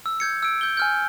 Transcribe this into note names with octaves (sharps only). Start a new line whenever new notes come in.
E6
G6 G#6 C#7
E6 D7
E6 G6 G7
G#5 F6 G6